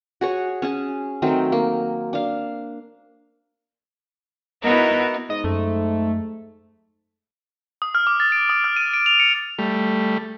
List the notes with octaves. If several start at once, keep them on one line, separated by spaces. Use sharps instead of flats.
F#4 G#4 C#5
C#4 G#4 A5
D#3 F#3 A3 C4
A#3
D4 F5
B3 D#4 E4 F#4 A#4
G#2 D#5
F#2 A3
D#6
F6
D6
A6
D7
D#6
F6
D#7
D7
F7
C#7
G3 A3